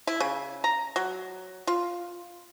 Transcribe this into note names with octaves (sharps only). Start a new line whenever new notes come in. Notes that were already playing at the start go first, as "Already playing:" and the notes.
E4
C#3
A#5
F#3
F4